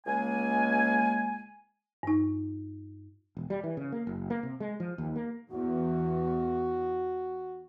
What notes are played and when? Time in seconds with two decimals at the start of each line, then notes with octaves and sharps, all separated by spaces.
0.06 C#2 G#3 A#3 G#5
2.03 G2 D#4
3.37 E1
3.50 G3
3.64 E3
3.77 C#3
3.92 A#3
4.07 F#1
4.30 A#3
4.43 C3
4.60 G#3
4.80 F3
4.98 D#2
5.16 A#3
5.52 E2 F#4